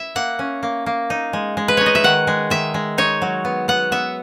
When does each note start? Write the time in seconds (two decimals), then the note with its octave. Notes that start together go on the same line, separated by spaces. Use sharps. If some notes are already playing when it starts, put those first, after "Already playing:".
Already playing: E4 E5
0.16 A#3 F#5
0.39 C#4
0.63 A#3
0.86 A#3
1.10 D#4
1.33 G#3
1.57 G#3
1.68 B4
1.77 D#4 C#5
1.86 D#5
1.95 E5
2.04 D#3 F#5
2.27 G#3
2.50 D#3 E5
2.74 G#3
2.98 D#4 C#5
3.22 F#3
3.45 B3
3.68 B3 F#5
3.92 B3 E5